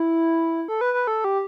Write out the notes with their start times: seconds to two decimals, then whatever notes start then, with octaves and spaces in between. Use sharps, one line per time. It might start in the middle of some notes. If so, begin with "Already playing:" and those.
Already playing: E4
0.68 A4
0.81 B4
0.94 B4
1.07 A4
1.24 G4